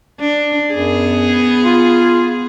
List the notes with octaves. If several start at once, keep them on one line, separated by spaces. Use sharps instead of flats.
D4
F#2 B3 G#4
F4